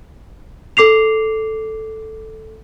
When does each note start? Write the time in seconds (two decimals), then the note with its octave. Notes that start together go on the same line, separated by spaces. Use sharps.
0.77 A4 D6 C7 F7